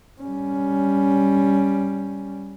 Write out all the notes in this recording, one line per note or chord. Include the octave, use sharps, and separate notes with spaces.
G3 C#4